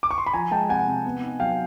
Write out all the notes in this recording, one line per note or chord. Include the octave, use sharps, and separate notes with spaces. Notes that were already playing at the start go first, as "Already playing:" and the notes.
D6
C#6
C6
B5
F3 G#5 A#5
G#3 G5 A5
C3 F#5 G#5
C3
B3
D#4
F#3 F5 G5